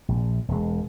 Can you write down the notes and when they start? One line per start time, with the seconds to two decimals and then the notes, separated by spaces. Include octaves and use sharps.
0.08 A#1
0.48 E1 G#3